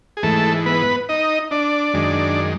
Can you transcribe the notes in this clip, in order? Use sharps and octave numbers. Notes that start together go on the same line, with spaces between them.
G#4
G#2 E3 A3 A4
B3 B4
D#4 D#5
D4 D5
F#2 D#3 G#3